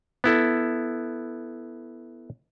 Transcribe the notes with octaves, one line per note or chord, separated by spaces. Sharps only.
B3 E4 A4